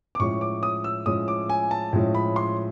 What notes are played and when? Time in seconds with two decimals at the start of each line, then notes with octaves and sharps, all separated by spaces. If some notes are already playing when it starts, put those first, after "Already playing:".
0.15 D6
0.19 A2 F3 G#3 C#4 C#6
0.41 D6
0.63 D#6
0.84 E6
1.06 A2 F3 G#3 C#4 D#6
1.28 D6
1.50 G#5
1.71 A5
1.93 A2 F3 G#3 C#4
2.15 B5
2.36 C6